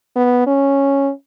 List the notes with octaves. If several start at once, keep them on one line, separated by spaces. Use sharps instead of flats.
B3
C#4